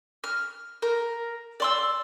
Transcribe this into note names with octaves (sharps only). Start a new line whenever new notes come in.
F6
A#4
D5 C6 E6